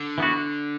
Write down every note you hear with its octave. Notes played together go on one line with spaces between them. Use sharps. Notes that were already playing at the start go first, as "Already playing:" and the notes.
Already playing: D3
E3 B3 F#4